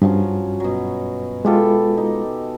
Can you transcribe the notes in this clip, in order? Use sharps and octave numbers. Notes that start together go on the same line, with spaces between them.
G2 F3 F#3 C#4
B2 F#3
G#3 E4 F4 G4 A4
D#4